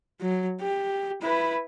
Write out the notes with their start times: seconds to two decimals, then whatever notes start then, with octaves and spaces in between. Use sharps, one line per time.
0.21 F#3
0.61 G4
1.22 E4 B4